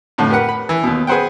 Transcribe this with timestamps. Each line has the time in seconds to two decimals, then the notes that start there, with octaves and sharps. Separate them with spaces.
0.18 F2 A2 D3
0.30 G4 A#4 B4 F#5
0.49 B5
0.69 E3
0.83 D#2 B2
1.07 G#4 B4 C5 F#5 G5